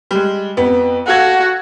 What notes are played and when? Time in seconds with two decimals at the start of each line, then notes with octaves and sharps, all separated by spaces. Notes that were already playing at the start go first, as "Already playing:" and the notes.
0.11 G3 G#3
0.57 F2 B3
1.07 F#4 A4 F5 G#6